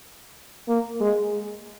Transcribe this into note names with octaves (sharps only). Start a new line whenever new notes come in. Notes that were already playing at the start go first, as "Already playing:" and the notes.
A#3
G#3